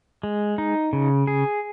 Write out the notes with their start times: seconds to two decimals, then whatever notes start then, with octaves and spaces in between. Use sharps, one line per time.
0.23 G#3
0.58 D#4
0.93 C#3
1.27 G#4